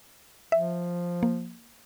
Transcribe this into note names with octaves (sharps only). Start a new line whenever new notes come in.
F3 E5
A#3